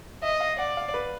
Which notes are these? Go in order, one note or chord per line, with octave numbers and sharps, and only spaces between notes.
D#5 E5
F5
D5 F#5
F5
B4